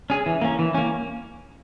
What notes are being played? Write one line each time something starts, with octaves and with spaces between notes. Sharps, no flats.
C#4 G#4
E3
A#3 C#4
E3
A#3 C#4